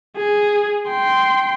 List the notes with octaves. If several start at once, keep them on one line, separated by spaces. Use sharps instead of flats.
G#4
G5 C6